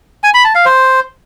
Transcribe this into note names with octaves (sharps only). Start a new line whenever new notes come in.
G#5
B5
A5
F5
C5